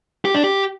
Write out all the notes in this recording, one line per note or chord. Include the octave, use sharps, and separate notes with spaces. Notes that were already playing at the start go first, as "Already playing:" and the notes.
G4
D4
G4